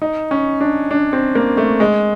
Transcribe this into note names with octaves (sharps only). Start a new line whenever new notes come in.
D#4
C#4
D4
D4
C4
A#3
A3
G#3